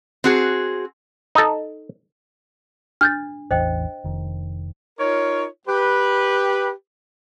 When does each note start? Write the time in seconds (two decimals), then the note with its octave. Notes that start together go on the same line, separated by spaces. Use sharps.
0.24 C4 F#4 G#4
1.35 D#4 A4
3.01 D4 F6 G6 A6
3.51 A1 E2 C5 D#5 G5
4.04 F1 D#3
4.99 D#4 F4 A#4 C#5
5.68 G4 B4